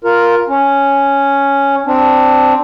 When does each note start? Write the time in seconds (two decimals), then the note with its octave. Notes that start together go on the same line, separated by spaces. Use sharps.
0.04 F4 A#4
0.48 C#4
1.86 C4 D4